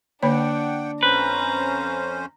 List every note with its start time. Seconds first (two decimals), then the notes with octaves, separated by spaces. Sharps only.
0.23 D3 A#3 D4 C#5 F#5 G5
1.03 F2 C#4 B4 C5 A#5